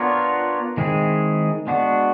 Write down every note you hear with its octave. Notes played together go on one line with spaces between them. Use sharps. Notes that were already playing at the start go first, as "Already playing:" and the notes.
Already playing: B3 D4 F4 A#4 C#5
D#3 G#3 C4 E4 G#4
G#3 B3 D4 F#4